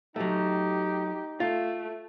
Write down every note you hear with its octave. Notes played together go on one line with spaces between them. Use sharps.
F#3 A3 D#4 G4
A3 F4